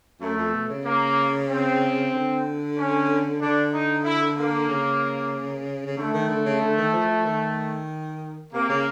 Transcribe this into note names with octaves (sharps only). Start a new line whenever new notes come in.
F#2 A3
F2
B2
C#3
A#3
C4
D3
C#4
D3 D4
D#4
E4
A#3
C#3
C#3
D3 A3
D#3
D3
C#3
D3
D#3
F3
F3
D#3
C3 A#3
C#3